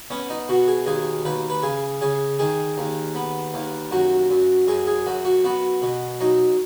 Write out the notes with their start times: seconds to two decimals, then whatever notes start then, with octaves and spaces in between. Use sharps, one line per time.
0.10 B3 C#4
0.30 D#4
0.49 B2 F#4
0.67 G#4
0.86 D#2 G#4
1.25 D#2 B4
1.50 B4
1.63 C#3 G#4
2.01 C#3 G#4
2.39 D#3 G#4
2.78 D#2
3.15 B3
3.54 D#2
3.91 F#2 F#4
4.30 F#2
4.67 F#2 G#4
4.87 G#4
5.06 F#2 F#4
5.25 F#4
5.44 B3 F#4
5.82 B2
6.20 F#3 D#4